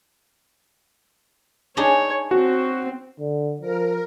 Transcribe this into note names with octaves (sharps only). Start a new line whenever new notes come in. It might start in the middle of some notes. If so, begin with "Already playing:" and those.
D4 D#4 G#4 C#5
C4 F#4
D3
F3 A#4